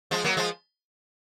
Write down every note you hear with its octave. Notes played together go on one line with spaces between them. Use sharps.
F3 G#3
F#3 A#3
F3 G#3